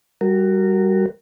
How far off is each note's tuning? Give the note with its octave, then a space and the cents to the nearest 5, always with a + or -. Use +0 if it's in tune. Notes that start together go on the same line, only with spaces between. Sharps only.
G3 +0 F#4 +15 A#4 -15